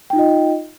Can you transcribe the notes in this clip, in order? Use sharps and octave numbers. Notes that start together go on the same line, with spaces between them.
D#4 F4 D#5 G5